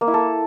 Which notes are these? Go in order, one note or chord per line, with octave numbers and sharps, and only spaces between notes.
A#3
E4
A4